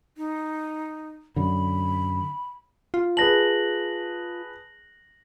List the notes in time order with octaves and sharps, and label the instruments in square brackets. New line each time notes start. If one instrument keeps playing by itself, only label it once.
[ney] D#4
[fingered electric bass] F#2 D3 [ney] B5
[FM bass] F4
[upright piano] G#4 B4 A5 [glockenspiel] A#6 F#7